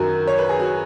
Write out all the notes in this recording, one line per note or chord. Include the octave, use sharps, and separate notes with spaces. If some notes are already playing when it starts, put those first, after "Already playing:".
Already playing: F#2 D#3 F#4
C#5
B4
G#4
F#4